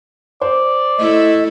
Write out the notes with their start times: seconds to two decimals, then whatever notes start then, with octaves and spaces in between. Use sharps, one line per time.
0.41 C5 D5
0.97 A3 E4 A4 D#5